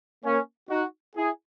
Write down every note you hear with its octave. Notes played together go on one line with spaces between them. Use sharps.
A#3 C#4
D#4 F#4
E4 G#4